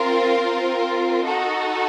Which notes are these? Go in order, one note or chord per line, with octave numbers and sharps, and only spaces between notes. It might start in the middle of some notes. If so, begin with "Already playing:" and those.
Already playing: C4 F4 A#4
D#4 F#4 A4